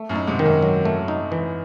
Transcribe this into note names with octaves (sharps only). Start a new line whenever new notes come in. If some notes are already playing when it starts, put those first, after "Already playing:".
Already playing: A3
F#2 A2
D#4
G#2 C3
D#3
F#2 A2
F#3
A3
D#4
E3